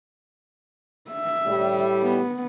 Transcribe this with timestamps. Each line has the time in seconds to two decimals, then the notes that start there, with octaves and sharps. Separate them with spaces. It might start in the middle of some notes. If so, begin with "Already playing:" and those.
1.11 E5
1.47 A2 G3
2.02 B3